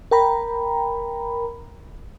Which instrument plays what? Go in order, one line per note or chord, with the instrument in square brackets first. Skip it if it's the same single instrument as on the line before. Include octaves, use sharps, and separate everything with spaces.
[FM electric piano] A#4 G5 A#5 B5